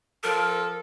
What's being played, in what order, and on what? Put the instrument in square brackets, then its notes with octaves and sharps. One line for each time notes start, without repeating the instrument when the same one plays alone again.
[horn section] F3 A4 [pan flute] A#4